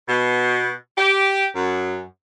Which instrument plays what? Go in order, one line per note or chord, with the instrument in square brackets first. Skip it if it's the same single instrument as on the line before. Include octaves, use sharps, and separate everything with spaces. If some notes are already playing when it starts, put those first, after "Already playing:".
[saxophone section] B2
G4
F#2